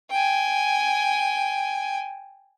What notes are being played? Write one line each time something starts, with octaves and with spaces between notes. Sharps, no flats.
G5 G#5